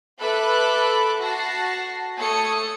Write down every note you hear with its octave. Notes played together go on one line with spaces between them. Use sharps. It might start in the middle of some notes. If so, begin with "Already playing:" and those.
A4 B4 E5 B5 D6 F#6
F#4 A5 A#6 C7
A3 A4 C#5 D#6 C#7